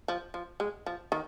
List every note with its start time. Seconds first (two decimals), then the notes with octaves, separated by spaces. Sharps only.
0.08 F3
0.34 F3
0.60 G#3
0.86 F3
1.12 D#3